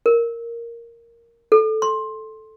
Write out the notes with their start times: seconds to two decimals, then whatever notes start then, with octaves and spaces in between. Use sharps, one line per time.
0.06 A#4
1.52 A4
1.82 C6